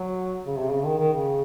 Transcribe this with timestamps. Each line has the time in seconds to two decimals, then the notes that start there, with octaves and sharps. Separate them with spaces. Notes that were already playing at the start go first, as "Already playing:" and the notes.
Already playing: F#3
0.45 C#3
0.59 C3
0.72 C#3
0.85 D#3
0.98 D#3
1.12 C#3